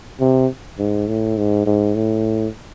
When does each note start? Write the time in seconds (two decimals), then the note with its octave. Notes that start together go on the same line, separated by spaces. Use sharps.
0.20 C3
0.78 G#2
1.08 A2
1.37 G#2
1.66 G#2
1.95 A2